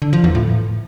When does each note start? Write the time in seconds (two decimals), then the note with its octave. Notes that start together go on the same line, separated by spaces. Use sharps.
0.02 D3
0.13 F3
0.24 E2
0.35 A2